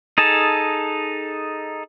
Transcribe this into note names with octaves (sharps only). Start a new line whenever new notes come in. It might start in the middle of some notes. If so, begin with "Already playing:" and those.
D#4 G#4 A4 A5